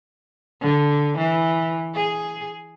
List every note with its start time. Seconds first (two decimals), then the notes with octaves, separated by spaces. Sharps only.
0.62 D3
1.17 E3
1.95 G#4